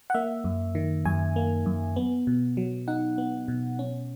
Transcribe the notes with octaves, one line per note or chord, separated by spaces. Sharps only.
F#5
A#3 E5
F#2
D#3
F#2 G#5
A#3
F#2
B3
B2
F#3
D#4 F#5
B3
B2
C#4